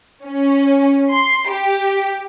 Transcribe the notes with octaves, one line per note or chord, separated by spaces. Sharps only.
C#4
C6
G4